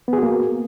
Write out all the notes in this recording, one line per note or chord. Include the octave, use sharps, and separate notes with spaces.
A#3 B3 F#4 G#4